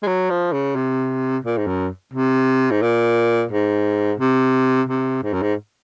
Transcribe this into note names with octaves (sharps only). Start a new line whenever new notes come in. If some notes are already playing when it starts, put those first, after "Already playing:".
G#3
F#3
F3
C#3
C3
A#2
G#2
F#2
C3
G#2
A#2
G#2
C3
C3
G#2
F#2
G#2